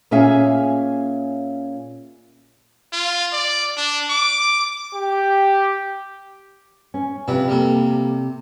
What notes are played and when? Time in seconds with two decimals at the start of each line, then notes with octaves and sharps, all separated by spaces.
0.11 A#2 C#4 G#4 E5 F5
2.93 F4
3.33 D5
3.77 D4
4.10 D6
4.95 G4
6.94 C#4
7.28 F2 C3 D4 B4
7.48 G3 A#3 A4